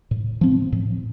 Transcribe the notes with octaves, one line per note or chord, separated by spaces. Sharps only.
A2
F3 C4
A2